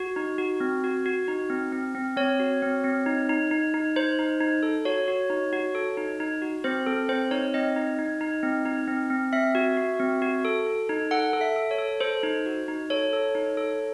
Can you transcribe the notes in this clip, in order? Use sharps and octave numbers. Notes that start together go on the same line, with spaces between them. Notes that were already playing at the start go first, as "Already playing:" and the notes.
Already playing: F#4
D#4
F#4
C4
F#4
F#4
D#4
C4
C4
C4
C4 C#5
F#4
C4
C4
D#4
D#4
D#4
D#4
D#4 C5
D#4
D#4
A4
F#4 C#5
F#4
D#4
F#4
A4
D#4
D#4
F#4
C4 C5
C4 A4
C4 C5
D#4 C#5
C4 D#5
D#4
D#4
D#4
C4
D#4
C4
C4
C4 E5
F#4
F#4
C4
F#4
A4
A4
D#4
A4 F#5
A4
E5
A4
C#5
A4
A4 C5
D#4
F#4
D#4
A4 C#5
A4
D#4
A4